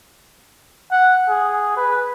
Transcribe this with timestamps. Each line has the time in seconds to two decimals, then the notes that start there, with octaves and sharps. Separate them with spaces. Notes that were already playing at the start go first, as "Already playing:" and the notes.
0.92 F#5
1.29 G#4
1.77 B4